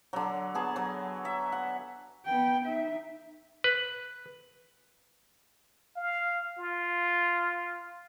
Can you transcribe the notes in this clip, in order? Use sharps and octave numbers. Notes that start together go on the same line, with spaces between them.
D3 F#3
B3 G#4 A5
F#3
E5
F#5
B3 G5
D#4 E5
B4
F5
F4